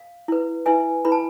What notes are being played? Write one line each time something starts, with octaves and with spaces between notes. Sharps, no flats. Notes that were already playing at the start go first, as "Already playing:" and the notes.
Already playing: F5
E4 B4
E4 B4 E5 G#5
E4 B4 B5
A5